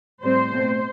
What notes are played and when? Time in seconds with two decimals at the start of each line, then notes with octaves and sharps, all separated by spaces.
0.22 A2 G3 C4 C5
0.50 B2 A3 C4